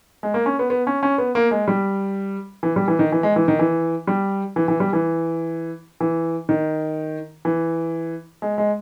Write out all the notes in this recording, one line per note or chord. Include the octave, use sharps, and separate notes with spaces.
G#3
A#3
C#4
B3
B3
C#4
C#4
B3
A#3
G#3
G3
E3
G3
E3
D#3
E3
G#3
E3
D#3
E3
G3
E3
E3
G3
E3
E3
D#3
E3
G#3
G#3